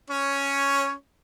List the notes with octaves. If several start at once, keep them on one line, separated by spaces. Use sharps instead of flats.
C#4 C#5